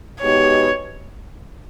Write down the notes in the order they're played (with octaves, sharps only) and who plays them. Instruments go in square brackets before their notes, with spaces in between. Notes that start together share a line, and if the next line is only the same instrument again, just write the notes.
[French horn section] B2 G#3 B3 D#4 G4 [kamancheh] C#5